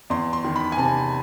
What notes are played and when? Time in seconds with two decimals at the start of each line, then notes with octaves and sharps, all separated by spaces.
0.10 E2 C6
0.33 C6
0.44 D#3
0.56 B5
0.72 G#5
0.78 C3 A5